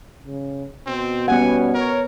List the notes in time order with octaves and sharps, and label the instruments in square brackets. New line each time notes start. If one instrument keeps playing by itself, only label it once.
[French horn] C#3
[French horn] B2 [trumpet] C4
[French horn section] G3 C#4 [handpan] B3 F#5 [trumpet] G#5
[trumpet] A#4 [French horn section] C#5